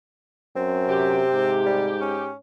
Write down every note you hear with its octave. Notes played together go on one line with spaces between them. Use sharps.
F#2 C4
C3 G4
G#2
G3
C#4